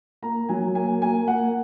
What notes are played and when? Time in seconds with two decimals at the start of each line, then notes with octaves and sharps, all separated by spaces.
0.22 A#3 A#5
0.49 F#3 G#5
0.75 A#3 G#5
1.02 A#3 G#5
1.28 A#3 F#5